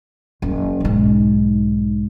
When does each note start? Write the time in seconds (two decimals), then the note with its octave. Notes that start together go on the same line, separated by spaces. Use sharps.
0.42 F#1 F#3
0.80 B1 G#2